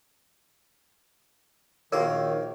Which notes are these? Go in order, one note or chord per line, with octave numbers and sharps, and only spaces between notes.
A#1 D#3 A#3 F#4 A#4 C5 C#5